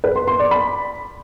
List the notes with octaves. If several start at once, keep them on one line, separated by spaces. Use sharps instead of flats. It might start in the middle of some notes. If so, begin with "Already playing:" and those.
B4
C6
C6
D5
B5